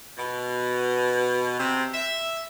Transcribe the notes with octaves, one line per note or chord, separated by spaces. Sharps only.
B2
C3
E5